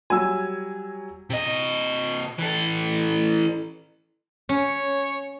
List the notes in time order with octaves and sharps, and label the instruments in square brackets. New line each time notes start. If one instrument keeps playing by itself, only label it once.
[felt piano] F#3 G3 [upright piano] G#5 E6
[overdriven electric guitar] C3 D#5
E3 A4
[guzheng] C#4 [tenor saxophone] C#5